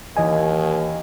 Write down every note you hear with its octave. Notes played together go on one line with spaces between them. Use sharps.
D#2 E3 D#5 G#5